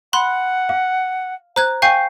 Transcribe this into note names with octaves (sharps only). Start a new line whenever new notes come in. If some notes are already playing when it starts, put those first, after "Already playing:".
F#5 B5 C6 F#6
F5
C5 A#5 F#6 G#6
F5 G5 G#5 C#6 G6 C7